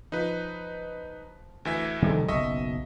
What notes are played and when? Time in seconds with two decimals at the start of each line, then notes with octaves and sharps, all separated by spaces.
0.12 F3 D#4 B4
1.65 D2 E3 E5
2.02 C3 D#3 F3 G3 A4
2.29 F#1 B1 D#5 E5 C#6